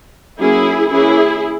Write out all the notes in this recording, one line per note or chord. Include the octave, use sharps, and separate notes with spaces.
F#3 A#3 C#4 E4 G#4
E3 A#3 C#4 E4 G#4